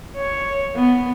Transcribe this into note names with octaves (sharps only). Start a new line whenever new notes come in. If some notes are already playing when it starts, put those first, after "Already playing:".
C#5
B3